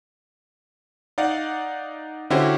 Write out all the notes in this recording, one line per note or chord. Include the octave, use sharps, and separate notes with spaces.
D#4 D5 F5 F#5
D3 C#4 E4 F#4 G4 C5